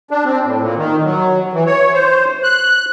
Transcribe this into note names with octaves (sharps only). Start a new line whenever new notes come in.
D4
C4
A2
A#2
D#3
F#3
E3
C#5
C5
F#6